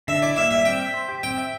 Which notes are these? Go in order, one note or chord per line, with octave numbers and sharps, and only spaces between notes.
D3 E5
E4 D5
A#3 E5
G3 E5
C4 G5
E5
C5
G4
C4 G5
E5